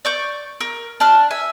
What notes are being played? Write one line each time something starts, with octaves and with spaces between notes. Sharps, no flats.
D5 C#6 G6
A#4
D4 A5 F6
E5 G#5